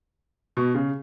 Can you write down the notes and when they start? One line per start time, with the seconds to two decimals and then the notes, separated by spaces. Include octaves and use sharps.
0.57 B2
0.75 C#3